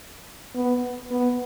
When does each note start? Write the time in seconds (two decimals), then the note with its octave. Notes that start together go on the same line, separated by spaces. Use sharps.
0.55 B3
1.10 B3